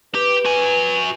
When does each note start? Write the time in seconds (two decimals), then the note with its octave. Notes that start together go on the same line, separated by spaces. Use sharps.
0.15 G4 B4
0.45 F#4 G#5